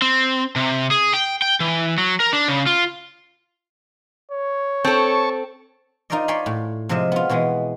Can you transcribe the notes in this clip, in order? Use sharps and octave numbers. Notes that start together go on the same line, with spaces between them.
C4
C3
G#4
G5
G5
E3
F#3
A#4
D4
C#3
F4
C#5
C4 A4 A5 C#6
D#4 F4 A#4 C5 D5 D#5
C#5 D5 G#5 B5 C6
A2
C3 F3 G#3 D#5 E5
B3 F4
B2 E3 G#3 B3